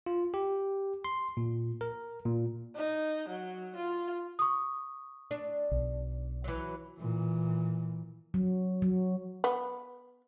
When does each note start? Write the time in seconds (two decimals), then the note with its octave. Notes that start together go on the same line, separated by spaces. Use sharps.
0.06 F4
0.34 G4
1.05 C6
1.37 A#2
1.81 A#4
2.26 A#2
2.76 D#4
3.29 F#3
3.77 F4
4.39 C#6 D#6
5.31 D4
5.71 B1
6.44 E3 F#3
6.99 A#2 E3
8.34 F#3
8.82 F#3
9.44 B3